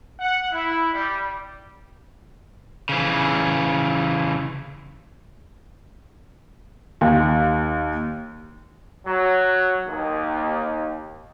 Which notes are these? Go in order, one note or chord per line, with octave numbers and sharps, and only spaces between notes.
F#5
E4
G3
C#3 E3
D#2
F#3
D#2